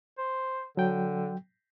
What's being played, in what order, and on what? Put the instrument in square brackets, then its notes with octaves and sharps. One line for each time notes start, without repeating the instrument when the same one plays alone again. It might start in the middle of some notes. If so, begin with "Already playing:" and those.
[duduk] C5
[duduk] D3 [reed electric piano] F#3 G5